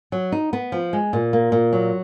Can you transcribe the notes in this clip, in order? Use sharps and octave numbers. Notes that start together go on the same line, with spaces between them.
F#3
D#4
B3
F3
G#3
A#2
A#3
A#2
F#3